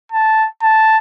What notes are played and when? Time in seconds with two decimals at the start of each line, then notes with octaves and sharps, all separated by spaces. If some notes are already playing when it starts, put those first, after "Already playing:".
0.12 A5
0.62 A5